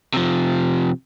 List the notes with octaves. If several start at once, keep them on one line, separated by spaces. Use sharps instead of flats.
C3 F3